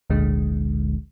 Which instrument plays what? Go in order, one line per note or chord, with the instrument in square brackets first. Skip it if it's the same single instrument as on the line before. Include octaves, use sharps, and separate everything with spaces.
[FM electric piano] G#1 D2 A#2 D3 G#3